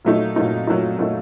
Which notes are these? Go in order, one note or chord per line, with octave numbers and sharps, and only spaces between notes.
A#2 F#3 A3 D#4
A#2 F#3 A3 D#4
A#2 F#3 A3 D#4
A#2 F#3 A3 D#4